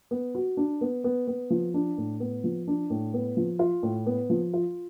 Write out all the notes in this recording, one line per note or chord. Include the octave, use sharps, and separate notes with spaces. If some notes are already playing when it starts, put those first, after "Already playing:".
B3
F#4
D4
B3
B3
B3
F3
D4
A2
B3
F3
D4
A2
B3
F3
F4
A2
B3
F3
F4